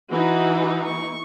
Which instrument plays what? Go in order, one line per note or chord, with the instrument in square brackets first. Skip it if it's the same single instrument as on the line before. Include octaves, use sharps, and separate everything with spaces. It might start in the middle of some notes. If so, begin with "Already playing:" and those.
[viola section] E3 D#4 [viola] F#4
[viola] C#6